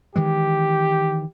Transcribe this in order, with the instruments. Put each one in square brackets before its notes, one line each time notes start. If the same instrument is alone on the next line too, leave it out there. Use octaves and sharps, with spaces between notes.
[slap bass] D#3 E3 G#3 [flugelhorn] G4